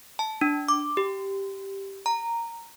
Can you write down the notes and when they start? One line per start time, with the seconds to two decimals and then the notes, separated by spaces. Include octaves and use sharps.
0.19 A5
0.41 D4
0.68 D6
0.97 G4
2.06 A#5